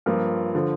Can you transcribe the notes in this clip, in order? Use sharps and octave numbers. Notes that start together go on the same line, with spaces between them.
G2 F3 A#3 F4
D3 F3